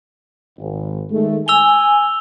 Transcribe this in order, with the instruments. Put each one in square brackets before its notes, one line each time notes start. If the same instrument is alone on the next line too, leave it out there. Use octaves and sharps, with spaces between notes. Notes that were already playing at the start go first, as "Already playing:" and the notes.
[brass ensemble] G#1
D#3 G#3 A3
[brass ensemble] G#5 [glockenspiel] E6 F7 G7